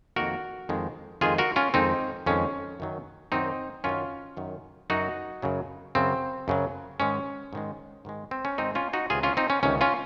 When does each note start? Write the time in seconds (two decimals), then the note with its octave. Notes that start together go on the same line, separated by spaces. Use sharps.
0.16 F2 D#3 A#3 F#4 A#4
0.69 F2 D#3 G#3
1.21 F2 D#3 G#3 F4 G#4
1.38 F#4 A#4
1.56 C#4 F4
1.74 F2 D#3 G#3 C4 D#4
2.26 F2 D#3 G#3 C#4
2.80 F#2 D#3 F#3
3.32 F#2 D#3 F#3 C4 D#4
3.84 F#2 D#3 F#3 C#4 F4
4.37 F#2 D#3 F#3
4.90 F#2 C#3 F#3 D#4 F#4
5.42 F#2 C#3 F#3
5.95 F#2 C#3 F#3 C4
6.48 F#2 C#3 F#3
7.00 G#2 D#3 G#3 C#4
7.53 G#2 D#3 G#3
8.05 G#2 D#3 G#3
8.31 C4
8.45 C#4
8.58 G#2 D#3 G#3 C4 D#4
8.75 C#4 F4
8.93 D#4 F#4
9.10 C#2 C3 D#3 F4 G#4
9.23 C#4 F4
9.37 C4 D#4
9.50 C#4
9.63 C#2 C3 D#3 C#4
9.81 C#4 F4